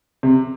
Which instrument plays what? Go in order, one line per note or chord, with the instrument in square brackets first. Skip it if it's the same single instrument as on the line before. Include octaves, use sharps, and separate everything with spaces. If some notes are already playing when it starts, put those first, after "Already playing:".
[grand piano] C3